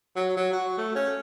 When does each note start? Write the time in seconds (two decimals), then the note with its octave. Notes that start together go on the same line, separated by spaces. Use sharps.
0.16 F#3
0.37 F#3
0.53 F#4
0.78 A3
0.95 C#4